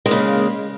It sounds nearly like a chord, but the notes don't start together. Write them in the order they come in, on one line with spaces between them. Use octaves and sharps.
G#3 A#3 C#3